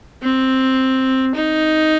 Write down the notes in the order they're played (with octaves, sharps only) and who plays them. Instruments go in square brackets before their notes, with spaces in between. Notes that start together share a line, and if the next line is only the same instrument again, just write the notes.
[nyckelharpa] C4
D#4